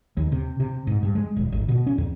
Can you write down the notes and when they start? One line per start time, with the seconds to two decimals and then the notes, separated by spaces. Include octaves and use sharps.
0.17 D#2
0.32 C3
0.60 C3
0.87 G#2
1.03 G2
1.15 G#3
1.36 D#1
1.52 G#1
1.68 B2
1.86 C#4
1.98 E2